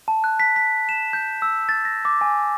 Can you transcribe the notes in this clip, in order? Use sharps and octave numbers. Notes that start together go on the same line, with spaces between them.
A5
F#6
B6
B6
E7
G6
E6
A6
A#6
D6
G#5